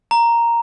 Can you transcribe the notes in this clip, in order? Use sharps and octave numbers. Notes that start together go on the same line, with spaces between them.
A#5